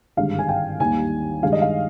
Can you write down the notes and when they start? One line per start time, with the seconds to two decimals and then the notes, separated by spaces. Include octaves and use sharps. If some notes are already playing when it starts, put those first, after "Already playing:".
0.17 G#1 G2 D3 G#3 F5
0.39 G#5
0.49 G5
0.80 D#2 D#3 G3 A#3 G#5
1.42 G2 D#3 G#3 F5
1.52 D#5
1.62 F5